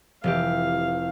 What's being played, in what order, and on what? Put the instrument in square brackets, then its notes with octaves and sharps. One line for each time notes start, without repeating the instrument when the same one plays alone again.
[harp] F1 E3 G4 [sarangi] F5